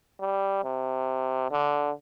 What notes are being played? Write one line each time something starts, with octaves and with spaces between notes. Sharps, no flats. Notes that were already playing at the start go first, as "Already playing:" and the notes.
G3
C3
D3